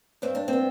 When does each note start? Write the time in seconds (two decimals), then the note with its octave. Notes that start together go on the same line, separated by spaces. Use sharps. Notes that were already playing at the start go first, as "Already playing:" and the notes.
0.22 G2 C4
0.35 D4
0.48 C4
0.53 B3